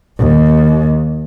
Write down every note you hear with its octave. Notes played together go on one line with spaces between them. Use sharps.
D#2